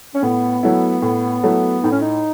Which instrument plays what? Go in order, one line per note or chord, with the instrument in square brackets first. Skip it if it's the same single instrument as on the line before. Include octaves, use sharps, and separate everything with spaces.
[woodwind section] C#4
[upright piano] A2 [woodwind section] B3
[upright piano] F#3 A3 E4
A2
F#3 A3 E4
[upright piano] A2 [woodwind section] D#4
[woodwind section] C#4
D#4